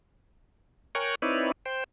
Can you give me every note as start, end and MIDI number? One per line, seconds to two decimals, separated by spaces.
0.95 1.15 70
0.95 1.15 73
0.95 1.15 79
0.95 1.15 80
0.95 1.15 85
0.95 1.15 90
1.22 1.52 60
1.22 1.52 63
1.22 1.52 64
1.22 1.52 71
1.22 1.52 73
1.22 1.52 74
1.66 1.84 72
1.66 1.84 79